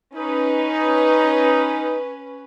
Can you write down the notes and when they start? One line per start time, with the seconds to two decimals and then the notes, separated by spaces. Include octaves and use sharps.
0.15 C#4 D#4 B4